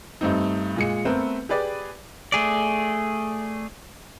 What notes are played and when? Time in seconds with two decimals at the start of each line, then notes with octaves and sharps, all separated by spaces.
0.21 G2 A3 C4 D#4
0.76 A#2 G#3 C#7
1.05 A3 B3 C4 A#4 B4
1.49 G4 G#4 B4 D5
2.32 A3 G#4 D5